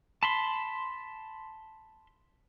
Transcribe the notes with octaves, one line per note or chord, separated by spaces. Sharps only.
A5 B5 C6